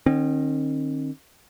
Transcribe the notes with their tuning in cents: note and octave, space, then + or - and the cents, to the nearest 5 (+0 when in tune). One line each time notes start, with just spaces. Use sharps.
D#3 -25 C4 +40